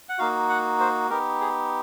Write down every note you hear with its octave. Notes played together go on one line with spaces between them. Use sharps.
F#5
A#3 D#4 F#4 F5
F#5
C5
B3 D#4 G4 A#4
G#4